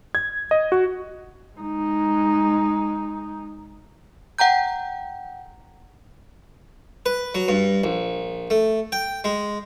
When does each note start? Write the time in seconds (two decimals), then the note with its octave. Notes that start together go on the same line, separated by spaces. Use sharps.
0.15 G#6
0.51 D#5
0.72 F#4
1.58 G#3 D#4
4.39 F#5 G5 A#5 G6
7.06 B4
7.35 F#3
7.48 G2
7.84 A#1
8.50 A3
8.92 G5
9.24 G#3